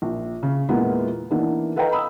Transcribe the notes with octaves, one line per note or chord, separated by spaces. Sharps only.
A#1
C#3
E2 A#2 E3 G#3 A#3 B3
E3 A#3 B3 D4 D#4
A4 B4 D#5 F5 G5 A#5
A#5 B5 D#6 E6